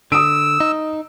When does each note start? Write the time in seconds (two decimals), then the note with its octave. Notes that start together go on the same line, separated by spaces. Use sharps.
0.12 D3 D#6 E6 D7
0.60 D#4